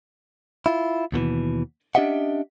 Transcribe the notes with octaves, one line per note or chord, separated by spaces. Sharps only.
E4 F4
D#2 B2 D#3 E3
C#4 D4 G4 D#5 E5 F#5